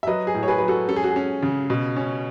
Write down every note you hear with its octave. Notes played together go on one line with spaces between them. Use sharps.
E5
F#3 B4 D#5
G#4
A2
C#5
G#4 B4
F#3 B4
F#4 A4
C#4 A4
G#4
F#4
G#4
C#4
C#3
B2
C#4